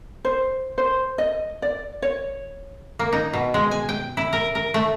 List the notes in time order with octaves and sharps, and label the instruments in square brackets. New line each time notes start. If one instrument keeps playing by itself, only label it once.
[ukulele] C5
C5
D#5
D5
C#5
[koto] A#3
D#4
B2
G#3
G#5
G5
E4
A#4
A#4
A3